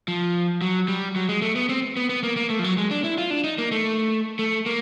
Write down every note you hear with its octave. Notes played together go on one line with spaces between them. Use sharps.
F3
F#3
G3
F#3
G#3
A3
B3
C4
B3
B3
A#3
A#3
A3
F3
F#3
G#3
D4
E4
F4
D4
D#4
A#3
A3
A3
A#3